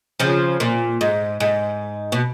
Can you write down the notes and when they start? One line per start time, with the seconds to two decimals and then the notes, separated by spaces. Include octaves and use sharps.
0.20 C#3 F3
0.60 A#2
1.01 G#2
1.40 G#2
2.12 B2